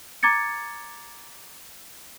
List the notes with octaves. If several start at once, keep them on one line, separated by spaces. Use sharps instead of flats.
A#5 D6 G#6 A6 C#7